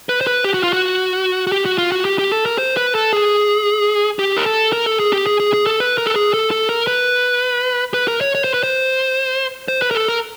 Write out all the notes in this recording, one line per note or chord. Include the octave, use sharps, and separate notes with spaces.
B4
C5
B4
G4
F#4
F4
F#4
F#4
G4
F#4
F4
F#4
G4
G4
A4
A#4
C5
B4
A4
G#4
G4
A#4
A4
A#4
A4
G#4
G4
G#4
G#4
G#4
A4
B4
A#4
A4
G#4
A4
A4
A#4
B4
B4
A#4
C#5
C#5
C5
B4
C5
C5
B4
A#4
A4
A#4